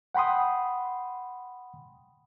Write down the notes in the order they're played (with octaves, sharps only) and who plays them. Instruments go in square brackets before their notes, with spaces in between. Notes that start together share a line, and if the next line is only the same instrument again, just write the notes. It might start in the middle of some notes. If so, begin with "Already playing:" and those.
[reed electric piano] F#5 G5 B5 C6 D#6